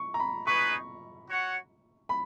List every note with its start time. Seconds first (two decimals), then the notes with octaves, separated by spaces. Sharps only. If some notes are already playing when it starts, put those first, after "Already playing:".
Already playing: C#6
0.14 A#5
0.20 B5
0.47 D#4 G#4 B4 C#6
1.28 F#4 C#5 F#5
2.09 B5